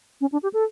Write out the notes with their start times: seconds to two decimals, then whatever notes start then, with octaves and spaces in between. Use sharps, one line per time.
0.21 C#4
0.32 D4
0.43 G4
0.53 A4